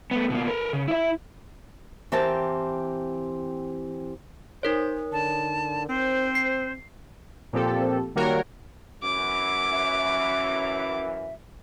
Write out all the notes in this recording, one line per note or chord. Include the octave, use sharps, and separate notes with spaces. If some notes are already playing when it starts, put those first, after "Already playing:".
A3 B3
B2 A#3
A#4 B4
C#3
E4 E5
E3 C4 G4 A#4 A5
D#4 A#4 C5 C#5
D3 A5
C4 C5
C7
A#2 F3 C4 G4 A4
D#3 G3 A#3 F#4 A#4 C#5
F#2 E3 D6
E5